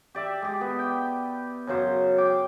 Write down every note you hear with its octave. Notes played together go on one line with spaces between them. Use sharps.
G4 D5 E5
G#3 G4
B3
G5
F#2 C#3 F#3 C5
G5 D6